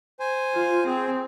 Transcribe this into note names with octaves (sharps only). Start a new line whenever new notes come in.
C5 G#5
F4
C4 G#4